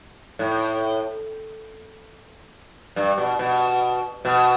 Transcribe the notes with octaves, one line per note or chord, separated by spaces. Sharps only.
A2
G2
B2
B2
B2